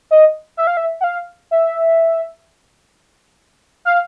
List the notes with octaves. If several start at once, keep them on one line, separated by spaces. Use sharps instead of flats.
D#5
E5
F5
E5
F#5
F5
E5
F5